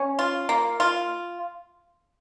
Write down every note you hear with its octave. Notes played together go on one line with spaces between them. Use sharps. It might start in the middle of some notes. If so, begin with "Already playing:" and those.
Already playing: C#4
F4
A#3
F4